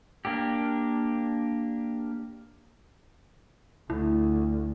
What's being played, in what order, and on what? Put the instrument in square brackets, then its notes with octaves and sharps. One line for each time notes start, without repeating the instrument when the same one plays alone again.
[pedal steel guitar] A#3 D4 G4
[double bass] D2 [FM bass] E4